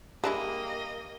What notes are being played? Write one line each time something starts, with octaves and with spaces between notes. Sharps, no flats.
G#3 A#3 D4 E4 G4 D#5